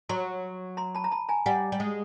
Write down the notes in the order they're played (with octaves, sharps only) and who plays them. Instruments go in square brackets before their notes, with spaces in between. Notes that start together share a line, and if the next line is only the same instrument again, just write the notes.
[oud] F#3 [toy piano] A#5 C6
[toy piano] A#5 C6
A5 B5
A#5
A5 B5
G#5 A#5
[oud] G3 [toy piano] F#5 G#5
[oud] G3
G#3